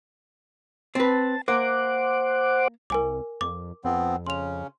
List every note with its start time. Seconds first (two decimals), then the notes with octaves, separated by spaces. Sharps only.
0.95 C4 B4 A5
1.48 A#3 C5 F#5 D6
2.90 C2 A#4 G#5 D6
3.41 F2 D6
3.84 F2 F3 B3 C4
4.27 C#3 C#4 C6 F7